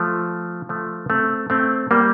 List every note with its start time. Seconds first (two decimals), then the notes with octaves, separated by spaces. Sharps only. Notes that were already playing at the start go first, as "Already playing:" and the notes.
Already playing: F3 A3
0.69 F3 A3
1.10 A3 C4
1.50 A3 C4
1.91 G3 A#3